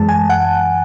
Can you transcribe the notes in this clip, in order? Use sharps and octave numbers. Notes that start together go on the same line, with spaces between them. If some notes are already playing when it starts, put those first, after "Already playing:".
Already playing: F#2 E3 G#3 A5
G#5
F#5